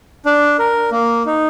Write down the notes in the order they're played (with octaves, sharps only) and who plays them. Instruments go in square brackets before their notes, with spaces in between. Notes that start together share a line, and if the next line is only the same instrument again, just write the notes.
[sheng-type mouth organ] D4
A#4
A#3
D#4